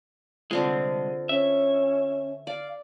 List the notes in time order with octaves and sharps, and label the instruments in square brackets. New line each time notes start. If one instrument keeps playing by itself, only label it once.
[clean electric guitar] C2 G#3 [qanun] D3 C4 F4
[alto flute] C#4 [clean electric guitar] E5
[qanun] D5 [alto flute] F5